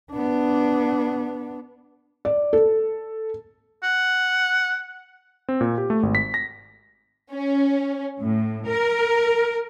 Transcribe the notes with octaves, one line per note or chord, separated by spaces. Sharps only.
B3 D4
D5
A4
F#5
C4
A#2
G4
A3
G#1
B6
A#6
C#4
A2
A#4